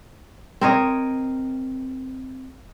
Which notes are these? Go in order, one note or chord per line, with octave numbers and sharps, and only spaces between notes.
C4 A#4 C#5 D#5